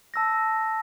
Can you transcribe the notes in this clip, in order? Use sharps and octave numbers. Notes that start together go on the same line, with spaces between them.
A5 E6 A#6